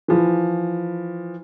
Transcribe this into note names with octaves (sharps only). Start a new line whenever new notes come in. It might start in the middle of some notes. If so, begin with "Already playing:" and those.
E3 F3